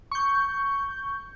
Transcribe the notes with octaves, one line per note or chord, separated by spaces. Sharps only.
C#6 G6